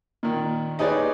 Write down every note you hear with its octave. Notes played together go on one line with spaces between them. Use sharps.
A#2 D#3
D#4 G4 G#4 B4 C#5 D5